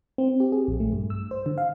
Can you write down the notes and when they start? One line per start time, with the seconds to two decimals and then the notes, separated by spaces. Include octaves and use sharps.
0.18 C4
0.40 G4
0.52 G#4
0.68 A#1
0.80 A3
0.92 G2
1.10 E6
1.31 C5
1.46 D3
1.58 F5